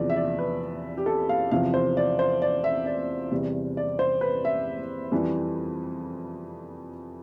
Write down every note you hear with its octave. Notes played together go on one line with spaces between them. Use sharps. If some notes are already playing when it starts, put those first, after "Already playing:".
Already playing: E2 C3 F3 D5
E5
D5
B4
G4
A4
F5
E2 C3 F3 F5
C5
D5
C5
D5
E5
D5
E2 C3 G3
D5
C5
B4
E5
F2 E3 G3